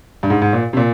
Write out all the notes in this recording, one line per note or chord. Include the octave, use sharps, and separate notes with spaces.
G2
G#2
G#2
A#2
C3
A#2